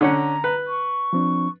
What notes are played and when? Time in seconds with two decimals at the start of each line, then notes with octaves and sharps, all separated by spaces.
0.01 D3 C#4 F#5 A#5
0.44 B4
0.67 C#6
1.13 F3 C4 D4